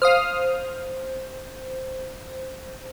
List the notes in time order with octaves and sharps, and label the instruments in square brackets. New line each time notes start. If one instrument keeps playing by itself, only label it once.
[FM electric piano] C5 [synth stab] F5 D#6 F6